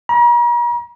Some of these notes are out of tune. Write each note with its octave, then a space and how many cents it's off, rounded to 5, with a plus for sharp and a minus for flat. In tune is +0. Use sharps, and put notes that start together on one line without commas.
A#5 +45